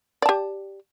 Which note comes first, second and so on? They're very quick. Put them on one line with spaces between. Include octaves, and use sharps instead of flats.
D5 A5 G4